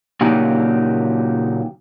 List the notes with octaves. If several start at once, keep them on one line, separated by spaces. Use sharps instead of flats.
A#2 C#3 F#3 A#3 D#4 G4